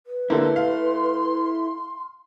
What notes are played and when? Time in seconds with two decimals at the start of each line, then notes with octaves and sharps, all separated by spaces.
0.06 B4
0.30 D3 A#3 E4 A4 C6
0.56 F5